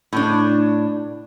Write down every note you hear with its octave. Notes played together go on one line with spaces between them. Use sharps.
A2 D4